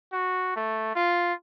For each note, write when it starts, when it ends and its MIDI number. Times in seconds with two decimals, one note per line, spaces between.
0.13 0.54 66
0.56 0.94 57
0.95 1.33 65